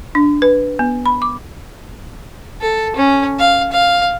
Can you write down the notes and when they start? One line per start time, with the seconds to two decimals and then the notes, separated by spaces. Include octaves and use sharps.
0.15 D4
0.42 B4
0.79 B3
1.06 B5
1.22 D6
2.61 A4
2.96 C#4
3.39 F5
3.72 F5